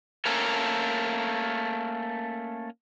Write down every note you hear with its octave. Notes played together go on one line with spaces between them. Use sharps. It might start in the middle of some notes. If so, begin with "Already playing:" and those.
A3 A#3 C#4 A4 A#4